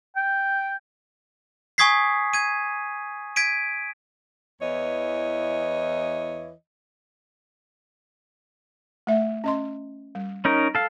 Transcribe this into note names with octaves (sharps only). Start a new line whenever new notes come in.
G5
G#5 C#6 D#6 G#6 B6 C7
G#6 D#7
G#6 B6 D7 D#7
E2 E3 C#5 D#5
A3 E5
C#4 D#5 C6
G3
C#4 D#4 A#4
A4 F5